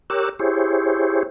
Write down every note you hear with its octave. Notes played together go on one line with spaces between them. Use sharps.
G4 A#4 C#5 D6 E6 F#6
E4 G4 G#4 C5 C#5